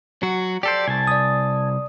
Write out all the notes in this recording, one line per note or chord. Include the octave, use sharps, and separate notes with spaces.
F#3 F#4
G4 A4 C5 D5
C2 G#5 A5
D5 D#6